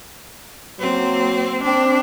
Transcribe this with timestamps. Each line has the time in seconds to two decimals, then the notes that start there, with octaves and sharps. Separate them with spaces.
0.79 F#3 A#3 C4
1.63 C4 D4